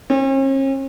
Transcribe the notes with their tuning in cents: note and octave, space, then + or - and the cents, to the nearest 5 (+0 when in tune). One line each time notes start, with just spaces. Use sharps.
C#4 -45